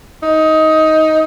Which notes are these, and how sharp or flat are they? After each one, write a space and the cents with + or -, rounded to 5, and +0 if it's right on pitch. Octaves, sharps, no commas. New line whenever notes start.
D#4 +15